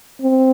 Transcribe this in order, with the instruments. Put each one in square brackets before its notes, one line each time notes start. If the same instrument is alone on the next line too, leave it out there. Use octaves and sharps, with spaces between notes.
[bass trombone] C4